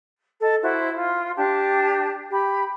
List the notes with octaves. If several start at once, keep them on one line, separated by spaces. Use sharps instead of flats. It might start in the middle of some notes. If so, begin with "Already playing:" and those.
A4 D#5
E4 F#4 C5
F4
D4 G4 A5
G4 B5